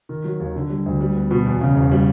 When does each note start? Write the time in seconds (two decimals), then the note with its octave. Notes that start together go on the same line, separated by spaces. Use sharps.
0.09 D#3
0.24 F#3
0.40 D#2
0.56 D3
0.70 G3
0.86 D2
1.01 G3
1.16 B3
1.31 B2
1.46 E2
1.61 C#3
1.76 E1
1.91 G3